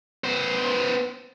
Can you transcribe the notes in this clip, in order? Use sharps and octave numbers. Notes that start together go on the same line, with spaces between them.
B3 C5